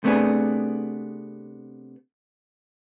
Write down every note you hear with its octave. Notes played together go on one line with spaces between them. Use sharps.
C3 A3 B3 D4 G#4